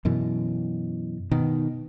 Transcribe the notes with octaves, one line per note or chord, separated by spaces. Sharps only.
F#2 B2 E3
B2 D#3